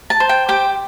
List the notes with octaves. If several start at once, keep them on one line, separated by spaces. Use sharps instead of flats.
A5
C5
G5
G4 G5